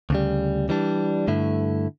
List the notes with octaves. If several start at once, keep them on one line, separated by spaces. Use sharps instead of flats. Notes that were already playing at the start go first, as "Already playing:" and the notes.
D2 C#3 G3
E3 G3 D4
G2 D3 A3 E4